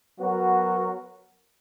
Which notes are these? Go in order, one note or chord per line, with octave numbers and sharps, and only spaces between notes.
F#3 B3 F#4 A#4